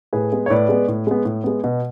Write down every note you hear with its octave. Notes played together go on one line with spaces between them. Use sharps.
A2 G#4 B4
G#3 B3
C#5
A2 B4 D5
G#3 B3
A2
G#3 B3
A2
G#3 B3
B2